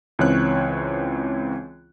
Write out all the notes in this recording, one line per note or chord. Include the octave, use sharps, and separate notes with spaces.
C#2 E3 C4 C#5 F#6